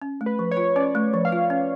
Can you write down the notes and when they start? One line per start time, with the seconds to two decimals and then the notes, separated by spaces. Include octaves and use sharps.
0.02 C#4
0.21 A3
0.26 B4
0.39 F3
0.51 C#5
0.57 F4
0.76 C#4 D5
0.95 A3
1.14 F3
1.25 F5
1.32 F4
1.50 C#4